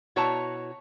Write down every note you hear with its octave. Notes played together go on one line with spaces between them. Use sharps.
B2 E4 F#4 C#5 A5 A#5